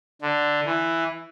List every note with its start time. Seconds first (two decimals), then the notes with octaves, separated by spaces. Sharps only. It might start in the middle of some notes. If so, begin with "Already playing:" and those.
0.22 D3
0.66 E3